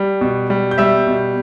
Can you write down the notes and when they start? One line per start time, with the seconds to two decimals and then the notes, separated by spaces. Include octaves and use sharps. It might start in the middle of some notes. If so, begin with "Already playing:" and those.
Already playing: G3
0.21 B2
0.50 G3
0.71 G6
0.78 G3 E5 E6
1.07 B2